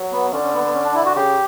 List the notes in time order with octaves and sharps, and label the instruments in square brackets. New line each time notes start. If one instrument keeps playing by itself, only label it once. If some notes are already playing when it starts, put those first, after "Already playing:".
Already playing: [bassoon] F#3
[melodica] B3
[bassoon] D3 [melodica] C#4
[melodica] C#4
B3
B3
C#4
D4
E4
F#4
[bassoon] C#3 [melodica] G4